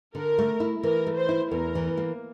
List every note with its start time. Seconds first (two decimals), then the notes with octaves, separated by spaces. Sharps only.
0.15 D3 A#4
0.38 A3
0.60 E4
0.83 E3 A#4
1.07 A3
1.17 C5
1.29 E4
1.51 E2 A#4
1.75 E3
1.97 A#3